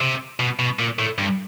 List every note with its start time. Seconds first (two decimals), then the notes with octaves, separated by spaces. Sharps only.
0.01 C3
0.40 B2
0.59 B2
0.79 A#2
0.99 A2
1.18 G2